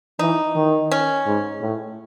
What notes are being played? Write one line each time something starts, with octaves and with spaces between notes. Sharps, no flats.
E3 D#4
D#3
C#4
G#2
A2